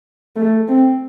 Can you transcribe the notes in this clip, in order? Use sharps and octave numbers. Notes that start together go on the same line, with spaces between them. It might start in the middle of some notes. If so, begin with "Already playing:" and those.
A3
C4